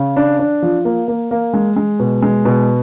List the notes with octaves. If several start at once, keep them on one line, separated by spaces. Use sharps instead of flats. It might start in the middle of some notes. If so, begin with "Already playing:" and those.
Already playing: C#3
D4
D4
F3
A#3
A#3
A#3
G#3
G#3
B2
G#3
B2